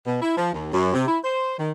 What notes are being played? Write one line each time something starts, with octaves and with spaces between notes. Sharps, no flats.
B2
E4
F3
D#2
F#2
C3
E4
C5
D#3